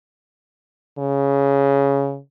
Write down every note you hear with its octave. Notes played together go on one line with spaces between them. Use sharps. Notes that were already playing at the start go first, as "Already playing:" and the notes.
C#3